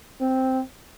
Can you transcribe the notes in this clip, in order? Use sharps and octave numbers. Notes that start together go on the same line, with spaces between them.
C4